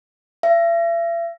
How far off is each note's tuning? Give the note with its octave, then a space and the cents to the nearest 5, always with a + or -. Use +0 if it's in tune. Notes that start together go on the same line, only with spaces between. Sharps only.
E5 +40